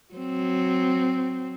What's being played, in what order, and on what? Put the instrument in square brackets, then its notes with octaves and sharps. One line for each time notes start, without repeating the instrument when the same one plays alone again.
[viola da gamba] F#3 C4